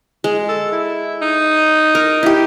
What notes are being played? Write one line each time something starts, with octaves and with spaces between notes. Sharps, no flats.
G#3
A4
E4
D#4
A#4
E4 G4